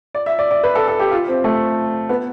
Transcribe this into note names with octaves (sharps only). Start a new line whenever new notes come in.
D5
E5
D5
D5
B4
A4
A4
G4
F4
C4
A3
B3